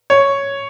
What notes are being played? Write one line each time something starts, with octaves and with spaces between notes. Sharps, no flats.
C#5